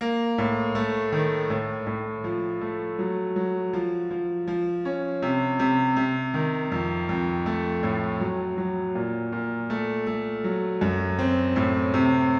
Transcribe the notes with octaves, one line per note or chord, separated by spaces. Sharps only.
A#3
A2
A3
D#3
A2
A2
F3
A3
F#3
F#3
F3
F3
F3
C#4
C3
C3
C3
D#3
F2
F2
A3
A2
F#3
F#3
A#2
A#2
A3
A3
F#3
F#2
C4
A2
C3